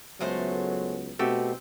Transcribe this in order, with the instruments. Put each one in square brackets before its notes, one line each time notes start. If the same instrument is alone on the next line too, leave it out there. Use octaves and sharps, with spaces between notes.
[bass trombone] C#2 [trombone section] F#3 B3 [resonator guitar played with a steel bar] G#3 A3 C5
[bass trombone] B2 [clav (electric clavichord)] A3 F#4 G4 [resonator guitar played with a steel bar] C4